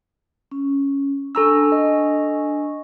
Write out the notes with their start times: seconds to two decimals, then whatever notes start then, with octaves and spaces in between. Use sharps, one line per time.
0.51 C#4
1.35 D4 A4 G#5 A#5 C#6 E6
1.72 D#5